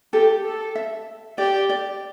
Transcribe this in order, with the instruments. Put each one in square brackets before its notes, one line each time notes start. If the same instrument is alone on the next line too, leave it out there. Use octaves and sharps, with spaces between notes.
[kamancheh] G4 [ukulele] A4
[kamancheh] A4
[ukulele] E5
[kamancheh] G4 [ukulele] D5
[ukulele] D5